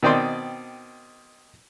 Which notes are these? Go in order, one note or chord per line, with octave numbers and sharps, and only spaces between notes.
B2 D#3 C4 D5 G5 C6